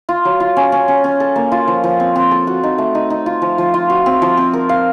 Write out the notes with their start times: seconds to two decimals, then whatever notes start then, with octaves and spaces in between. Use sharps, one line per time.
0.09 F4
0.25 F#3
0.40 F4
0.57 C#4
0.72 C#4
0.88 C#4
1.04 C#4
1.20 A4
1.36 A#3
1.52 F4
1.68 F3
1.84 F3
2.00 C4
2.16 C4
2.31 A4
2.47 F#4
2.63 D#4
2.78 A3
2.95 D#4
3.10 D#4
3.26 F4
3.42 F3
3.58 F3
3.74 F4
3.90 F#4
4.06 C4
4.22 F3
4.37 C4
4.53 A#4
4.69 F5